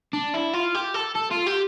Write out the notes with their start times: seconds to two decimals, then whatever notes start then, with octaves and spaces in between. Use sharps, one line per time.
0.13 D4
0.34 E4
0.53 F4
0.75 G4
0.94 A4
1.15 A4
1.31 F4
1.46 G4